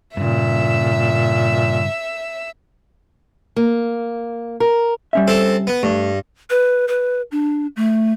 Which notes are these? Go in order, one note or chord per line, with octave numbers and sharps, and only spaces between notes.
G2 A#2 C#3 E5 E6
A#3
A#4
G3 C#4 E5
C4 A4
B3
G2 A3
B4
B4
D4
A3